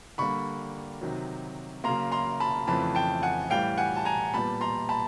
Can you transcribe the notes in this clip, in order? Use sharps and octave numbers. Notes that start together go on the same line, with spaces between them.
D3 G3 A#3 B5 C#6
C3 D#3 F#3
C#3 F#3 A#3 A#5 C6
A#5 C6
A5 B5
F2 C#3 E3 A3 C4 A5 B5
G5 A5
F#5 G#5
A2 E3 G3 F5 G5
F#5 G#5
A5
G#5 A#5
A#2 G3 B3 A5 B5
A#5 C6
A5 B5